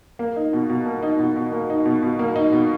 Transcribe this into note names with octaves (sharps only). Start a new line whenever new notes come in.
A#3
D#4
B2
B2
A#3
D#4
B2
B2
A#3
D#4
B2
B2
A#3
D#4
B2